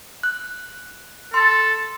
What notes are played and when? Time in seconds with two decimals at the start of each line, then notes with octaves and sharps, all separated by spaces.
0.23 F#6
1.34 A4 C6